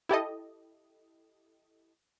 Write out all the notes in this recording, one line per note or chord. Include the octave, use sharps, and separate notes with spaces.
E4 G4 A4 D#5